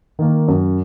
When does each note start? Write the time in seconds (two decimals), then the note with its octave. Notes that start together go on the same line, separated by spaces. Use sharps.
0.19 D#3 A#3
0.48 F#2